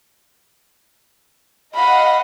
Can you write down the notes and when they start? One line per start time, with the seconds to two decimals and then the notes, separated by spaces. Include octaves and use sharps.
1.75 D#5 F5 F#5 B5